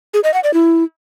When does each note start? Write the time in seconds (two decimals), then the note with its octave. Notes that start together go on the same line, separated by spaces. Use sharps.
0.14 G#4
0.24 D#5
0.34 F#5
0.44 D5
0.54 E4